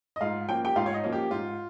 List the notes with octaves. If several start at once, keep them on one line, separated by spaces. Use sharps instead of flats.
D#5
G#2 F4 F5
F3 A#3 C#4 G5
G4 G5
G#2 F4 F5
C#5
D#4 D#5
F3 A#3 C#4
G4
G#2 F4